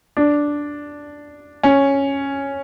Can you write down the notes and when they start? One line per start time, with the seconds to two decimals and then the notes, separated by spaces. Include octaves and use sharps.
0.17 D4
1.63 C#4